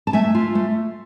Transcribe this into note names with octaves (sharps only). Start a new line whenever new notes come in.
A5
A3 E5 G#5
F4
A3